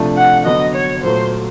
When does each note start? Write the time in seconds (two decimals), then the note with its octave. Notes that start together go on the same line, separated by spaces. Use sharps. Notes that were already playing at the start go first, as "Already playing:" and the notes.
Already playing: C3 F3 A3 D4
0.17 F#5
0.45 D3 F#3 B3 D#5
0.75 C#5
1.03 A#2 F#3 A3 C5